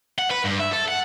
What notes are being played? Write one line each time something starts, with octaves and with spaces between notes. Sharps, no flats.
F#5
B4
G2
E5
A4
F#5